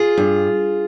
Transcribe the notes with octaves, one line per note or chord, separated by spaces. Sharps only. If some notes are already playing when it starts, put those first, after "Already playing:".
Already playing: F4 G#4
G2